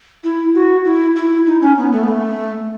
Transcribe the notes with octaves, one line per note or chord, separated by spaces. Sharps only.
E4
F#4
E4
E4
D#4
C#4
B3
A3
B3
A3